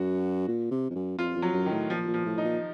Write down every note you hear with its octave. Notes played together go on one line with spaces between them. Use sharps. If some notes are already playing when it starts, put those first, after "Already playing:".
Already playing: F#2 F#4
A#2
C3
F2
F#2
F2 F4
F2
F#3
F#2
D#3
A2
A#2 F3
A#2
F3
A2
D#4
A#2